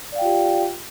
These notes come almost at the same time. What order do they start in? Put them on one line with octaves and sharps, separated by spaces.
D5 F5 G5 F4 G4